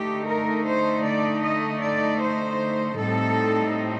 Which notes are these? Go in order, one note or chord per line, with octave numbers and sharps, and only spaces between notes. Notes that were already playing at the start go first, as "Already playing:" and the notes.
Already playing: D3 A3 D#4 G4
A#4
C5
D5
D#5
D5
C5
A2 G3 C4 D#4 A4